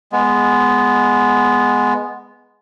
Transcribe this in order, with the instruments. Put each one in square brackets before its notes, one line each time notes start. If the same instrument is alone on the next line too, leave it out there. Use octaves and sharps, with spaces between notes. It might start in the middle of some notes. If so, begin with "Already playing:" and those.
[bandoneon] G#3 B3